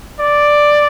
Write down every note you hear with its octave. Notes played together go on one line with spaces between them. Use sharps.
D5